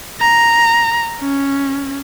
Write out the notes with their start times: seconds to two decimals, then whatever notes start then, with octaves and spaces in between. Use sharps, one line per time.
0.21 A#5
1.20 C#4